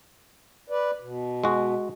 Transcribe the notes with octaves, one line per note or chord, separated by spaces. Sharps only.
B4 D5
B2
G#3 F#4